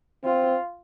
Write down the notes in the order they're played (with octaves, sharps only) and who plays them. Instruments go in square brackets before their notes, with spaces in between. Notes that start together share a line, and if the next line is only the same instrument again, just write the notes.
[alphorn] C4 [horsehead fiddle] F4